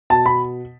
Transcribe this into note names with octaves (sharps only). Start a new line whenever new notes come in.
B2 A5
B2 B5